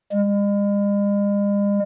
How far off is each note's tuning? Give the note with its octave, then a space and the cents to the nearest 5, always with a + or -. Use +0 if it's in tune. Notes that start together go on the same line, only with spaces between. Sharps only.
G#3 -45